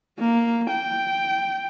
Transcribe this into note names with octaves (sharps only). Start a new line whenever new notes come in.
A#3
G5